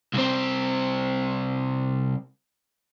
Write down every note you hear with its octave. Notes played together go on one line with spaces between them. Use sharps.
C2 C4